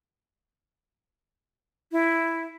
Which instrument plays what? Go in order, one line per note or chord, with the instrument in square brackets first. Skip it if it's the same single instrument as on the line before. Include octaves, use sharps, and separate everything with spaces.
[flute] E4